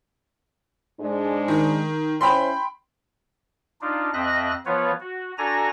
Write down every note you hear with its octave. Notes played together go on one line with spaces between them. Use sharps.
G#2 G#3 D4
D#3
C#4 E4 C5 G5 B5 C6
D4 D#4 F4
F2 C4 D#5 E5 F#6 A#6
F3 B3 F4 B4 C#5
F#4
D4 F#4 A4 G#5 A#5 A#6